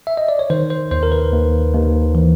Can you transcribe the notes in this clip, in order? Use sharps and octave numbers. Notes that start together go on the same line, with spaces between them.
E5
D#5
D5
C#5
D#3 C5
C5
D#2 C5
A#4
B4
D#2
D#2
E3